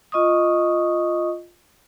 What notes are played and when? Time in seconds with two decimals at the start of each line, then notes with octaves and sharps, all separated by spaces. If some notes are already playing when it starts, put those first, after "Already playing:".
0.12 F4 D#5 C#6 D#6